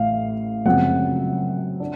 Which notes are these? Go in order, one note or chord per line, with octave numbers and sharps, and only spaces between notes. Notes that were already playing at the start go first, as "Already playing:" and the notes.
Already playing: A1 A2 F5
F#2 C#3 F3 G#3 C4 F#5
D4